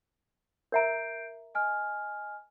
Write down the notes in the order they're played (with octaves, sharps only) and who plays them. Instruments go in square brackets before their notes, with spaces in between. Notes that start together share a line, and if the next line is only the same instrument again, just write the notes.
[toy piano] A#4 E5 A#5 [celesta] G6 C7 D7
[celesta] D#5 G#5 F6